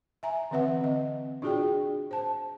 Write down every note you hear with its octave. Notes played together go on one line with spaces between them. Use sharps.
E5 G#5 A#5
D3 E3 C4 B4 E5 F#5
C4 D#5
D4 F4 F#4 G#4 D5 G5
C5 A5